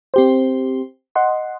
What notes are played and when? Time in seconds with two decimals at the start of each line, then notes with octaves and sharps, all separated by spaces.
0.14 C4 G4 C5
1.15 D#5 F#5 C6